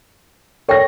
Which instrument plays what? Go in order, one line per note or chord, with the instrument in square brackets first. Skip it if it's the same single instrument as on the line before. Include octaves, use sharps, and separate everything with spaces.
[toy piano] A4 A#4 G5 [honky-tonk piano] C#5 A#6